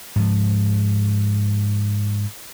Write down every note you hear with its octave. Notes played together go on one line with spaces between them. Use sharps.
G#2 F3